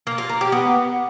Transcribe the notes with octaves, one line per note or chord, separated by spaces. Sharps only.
A#3
F4
A#4
G4
B3